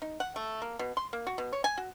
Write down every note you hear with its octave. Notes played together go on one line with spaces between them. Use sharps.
D#4
F#5
A3
A#3
B2
C6
A#3
F#4
B2
C#5
G#5
F#4